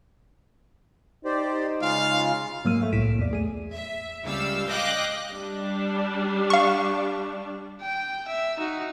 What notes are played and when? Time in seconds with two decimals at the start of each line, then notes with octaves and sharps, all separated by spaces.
1.25 D#4 G4 C5 D5
1.82 C#3 G#3 F4 F5
2.65 G#2 F#3 A#3 E6 F6 D#7
2.81 A3 C#5 F5
2.93 C2 A2 B6 D7 E7
3.19 E2 D5
3.31 A3 G#4 D#7
3.73 E5
4.24 C#2 G3 F5 E6
4.70 D#5 F5 G5 D6 F#6 A#6
5.31 G3 D4
6.50 F5 C#6
7.82 G5
8.28 E5
8.57 D#4 F#4